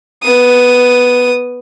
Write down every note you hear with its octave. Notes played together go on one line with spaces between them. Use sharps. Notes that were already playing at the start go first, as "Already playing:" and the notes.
B3 D#6